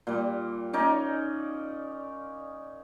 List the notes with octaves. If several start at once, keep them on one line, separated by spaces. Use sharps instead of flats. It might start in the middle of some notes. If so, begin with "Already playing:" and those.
A#2 G3
C#4 D#4 D5